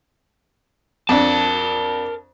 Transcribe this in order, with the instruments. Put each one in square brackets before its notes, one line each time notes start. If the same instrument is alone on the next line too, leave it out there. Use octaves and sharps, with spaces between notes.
[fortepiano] F2 D4 [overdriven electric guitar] A#4 A5